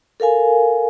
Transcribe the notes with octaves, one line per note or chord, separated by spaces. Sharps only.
A4 A#4 F5 G#5